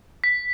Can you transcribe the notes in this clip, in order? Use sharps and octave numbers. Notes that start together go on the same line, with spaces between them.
B6